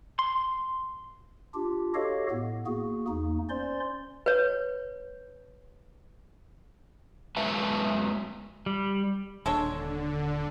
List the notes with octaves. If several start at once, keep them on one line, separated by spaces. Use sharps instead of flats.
C6
D4 F4 G4
F#4 G4 A4 C#5 D#5 F5
A2 B3
A#3 F#4 G#4
E2 A#3 D#4
C#4 C5 D5 C6
B4 C#5
F#3 G#3 B4 E5 F5 A5
G3
D#1 D3 G#3 D4 A4 C#5